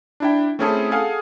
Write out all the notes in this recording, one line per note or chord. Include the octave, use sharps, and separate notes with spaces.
D4 E4 G5
A3 C4 C#4 E4 G#4 A4
G#4 A4 F5 F#5 G#5